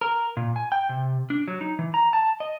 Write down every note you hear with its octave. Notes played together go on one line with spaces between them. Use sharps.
A#4
A#2
G#5
G5
C3
D4
F#3
D#4
E3
A#5
A5
D#5